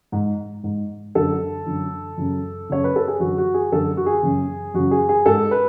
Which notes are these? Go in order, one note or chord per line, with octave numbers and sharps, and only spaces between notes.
G#2
G#2
F#2 D3 A4
F#2 D3
F#2 C#3
F#2 C#3 C#5
B4
A4
G#4
F#2 D3 F#4
F#4
G#4
F#2 D3 A4
F#4
G#4
F#2 C#3
F#2 C#3 F#4
G#4
G#4
G#2 A4
B4